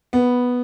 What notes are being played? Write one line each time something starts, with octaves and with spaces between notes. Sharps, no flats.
B3